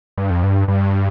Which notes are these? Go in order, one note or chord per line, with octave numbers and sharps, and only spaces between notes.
G2
F2
G2
G2